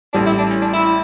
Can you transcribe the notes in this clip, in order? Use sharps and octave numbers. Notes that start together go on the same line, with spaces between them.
A1 A2 G3 D4
E4
D4
C#4
D4
E4